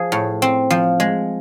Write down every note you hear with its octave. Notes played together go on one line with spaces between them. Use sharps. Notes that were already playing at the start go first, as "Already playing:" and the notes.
Already playing: F3 G#4
A2
C4
F3
G#3